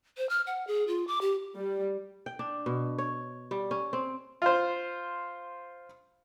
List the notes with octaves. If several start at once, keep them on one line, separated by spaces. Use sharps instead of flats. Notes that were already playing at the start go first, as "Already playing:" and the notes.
C5
F6
F#5
G#4
F4
D6
G4
G3
G5
D4
B2
C#5
G3
C#4
C4
F4 C5